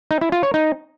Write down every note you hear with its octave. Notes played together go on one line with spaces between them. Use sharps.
D#4
E4
F4
C#5
D#4